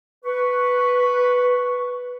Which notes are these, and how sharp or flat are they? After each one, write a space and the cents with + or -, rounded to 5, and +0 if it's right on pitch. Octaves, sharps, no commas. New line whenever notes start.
B4 +0 C#6 +0